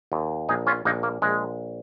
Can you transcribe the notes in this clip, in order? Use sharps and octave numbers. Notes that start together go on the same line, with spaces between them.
D#2
A#1 D#4 G#4
C#4 F4
A#1 A#3 D#4
A#3
A#1 G#3